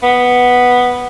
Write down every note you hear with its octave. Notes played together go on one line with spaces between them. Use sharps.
B3